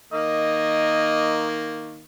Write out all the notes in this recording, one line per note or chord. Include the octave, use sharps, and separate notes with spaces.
D#3 A#3 D#5